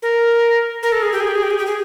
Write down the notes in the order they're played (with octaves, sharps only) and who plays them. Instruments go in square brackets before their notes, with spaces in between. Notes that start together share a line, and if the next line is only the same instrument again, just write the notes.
[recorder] A#4
A#4
A4
G#4
G4
G#4
G4
G#4
G4
G#4
G4
G#4